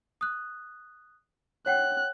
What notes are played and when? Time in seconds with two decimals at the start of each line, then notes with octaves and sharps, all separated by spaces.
0.21 D#6 F#6
1.66 C#5 F#5 G5 F#6